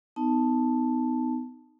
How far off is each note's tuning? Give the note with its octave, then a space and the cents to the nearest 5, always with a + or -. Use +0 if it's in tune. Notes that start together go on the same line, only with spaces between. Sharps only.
B3 +30 D#4 +0 A5 +0